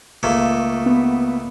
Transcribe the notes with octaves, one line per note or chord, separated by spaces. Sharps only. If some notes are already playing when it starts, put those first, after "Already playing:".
C#2 A3 A#3
B3